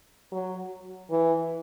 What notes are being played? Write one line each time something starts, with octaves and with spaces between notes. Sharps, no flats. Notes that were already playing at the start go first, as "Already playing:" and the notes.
F#3
E3